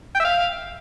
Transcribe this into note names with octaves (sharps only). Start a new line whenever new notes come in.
G5
E5
F5